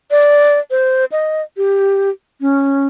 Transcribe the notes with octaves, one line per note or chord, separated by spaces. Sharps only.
D5
C5
D#5
G4
C#4